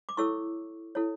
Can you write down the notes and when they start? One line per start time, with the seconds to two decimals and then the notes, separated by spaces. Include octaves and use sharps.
0.09 D6
0.17 E4 A4 C#5 C#6 E6
0.95 E4 A4 C#5